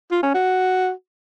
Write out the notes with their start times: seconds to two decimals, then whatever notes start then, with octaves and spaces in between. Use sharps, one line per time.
0.11 F4
0.23 C#4
0.34 F#4